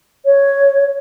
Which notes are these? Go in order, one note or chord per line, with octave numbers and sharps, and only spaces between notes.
C#5